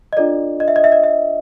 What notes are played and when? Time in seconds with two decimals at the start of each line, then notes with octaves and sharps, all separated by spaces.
0.13 D#5
0.17 D4 F4 A4 D5
0.60 D#5
0.68 E5
0.76 D#5
0.84 E5
0.92 D#5
1.03 E5